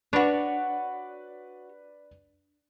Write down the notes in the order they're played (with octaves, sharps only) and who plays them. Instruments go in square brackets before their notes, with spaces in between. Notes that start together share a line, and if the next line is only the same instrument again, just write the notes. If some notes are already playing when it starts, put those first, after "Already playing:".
[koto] D4 [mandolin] F#4 C#5 [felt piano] B4 D5